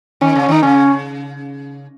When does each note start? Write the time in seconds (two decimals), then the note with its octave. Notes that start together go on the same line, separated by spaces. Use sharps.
0.21 D#3 C#4
0.32 C#4
0.35 C#3
0.42 C#4
0.49 D#3 D#4
0.63 C#3 C#4